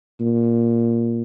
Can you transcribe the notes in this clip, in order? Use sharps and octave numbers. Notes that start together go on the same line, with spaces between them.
A#2